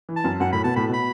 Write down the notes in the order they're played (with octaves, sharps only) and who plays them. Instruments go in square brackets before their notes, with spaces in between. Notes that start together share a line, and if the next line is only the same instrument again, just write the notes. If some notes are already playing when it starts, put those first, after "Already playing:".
[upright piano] E3
[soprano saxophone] A5
[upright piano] F#2
[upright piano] F#2 [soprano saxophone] F#5
[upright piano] A2 [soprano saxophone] B5
[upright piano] B2 [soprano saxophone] A5
[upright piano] A2 [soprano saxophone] B5
[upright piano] B2
[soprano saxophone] B5